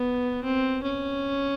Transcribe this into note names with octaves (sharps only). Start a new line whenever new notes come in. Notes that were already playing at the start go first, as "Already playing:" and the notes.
Already playing: B3
C4
C#4